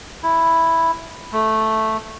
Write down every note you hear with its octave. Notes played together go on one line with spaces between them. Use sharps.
E4
A3